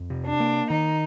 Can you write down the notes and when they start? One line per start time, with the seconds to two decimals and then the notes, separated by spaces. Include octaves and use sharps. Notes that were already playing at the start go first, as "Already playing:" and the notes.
Already playing: F2
0.10 C3
0.26 D4
0.40 A#3
0.70 D#3 D#4